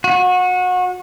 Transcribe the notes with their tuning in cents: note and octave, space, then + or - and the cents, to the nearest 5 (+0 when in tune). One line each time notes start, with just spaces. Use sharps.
F#4 -30